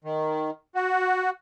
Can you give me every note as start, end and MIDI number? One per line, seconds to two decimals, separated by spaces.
0.04 0.51 51
0.75 1.30 66